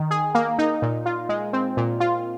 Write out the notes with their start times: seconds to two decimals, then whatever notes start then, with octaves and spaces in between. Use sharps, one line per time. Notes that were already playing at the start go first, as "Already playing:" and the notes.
Already playing: D#3
0.11 G#4
0.35 A#3
0.59 D#4
0.82 A#2
1.06 F4
1.29 G#3
1.53 C4
1.77 A#2
2.00 F4